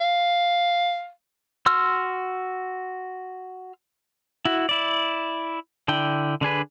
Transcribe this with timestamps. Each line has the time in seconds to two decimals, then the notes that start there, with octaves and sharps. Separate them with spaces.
0.01 F5
1.66 F#4 C6 E6 F6
4.45 E4 F#4
4.69 E4 D5
5.88 D3 D4 E4 G5
6.41 D3 D4 G#4 B4